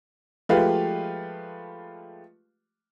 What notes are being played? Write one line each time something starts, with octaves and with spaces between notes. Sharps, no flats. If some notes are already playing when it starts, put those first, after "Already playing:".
F3 G#3 A3 G4 B4 F5